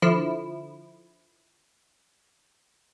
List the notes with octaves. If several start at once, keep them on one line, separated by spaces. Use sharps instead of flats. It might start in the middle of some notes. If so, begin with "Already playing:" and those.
D3 F3 E4